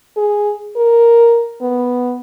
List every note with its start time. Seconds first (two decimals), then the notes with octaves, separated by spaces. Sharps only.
0.17 G#4
0.76 A#4
1.62 B3